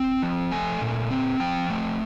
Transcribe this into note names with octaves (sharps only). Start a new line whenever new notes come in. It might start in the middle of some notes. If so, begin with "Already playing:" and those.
Already playing: C4
F3
A3 G#5
A#2
C4
F3 G5
A3